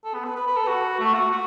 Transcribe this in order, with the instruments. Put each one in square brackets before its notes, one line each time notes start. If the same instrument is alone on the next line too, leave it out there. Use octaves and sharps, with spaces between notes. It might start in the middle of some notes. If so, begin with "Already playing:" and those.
[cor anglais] A4
B3
B4
B4
B4
A4
F#4
A3
F#4
F#4